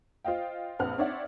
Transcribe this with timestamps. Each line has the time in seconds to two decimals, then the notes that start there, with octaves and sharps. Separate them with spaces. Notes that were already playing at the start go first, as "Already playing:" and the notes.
0.25 F4 C5 D#5 F5 G5
0.79 A#1 C4 B4 F#5 F6
0.98 C4 D#4 C#5 D5 E5 F#5